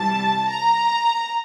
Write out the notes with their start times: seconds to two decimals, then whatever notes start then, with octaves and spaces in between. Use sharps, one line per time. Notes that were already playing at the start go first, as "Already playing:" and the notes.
Already playing: C3 E3 G3 A5
0.50 A#5